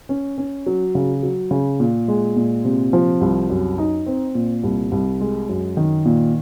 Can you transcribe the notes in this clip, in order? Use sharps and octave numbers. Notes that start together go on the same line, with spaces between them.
C#4
C#4
F#3
C#3
F#3
C#3
A#2
G#3
A#2
C3
F3
C2
F#2
D#4
C4
A#2
C2
C2
G#3
F#2
D#3
A#2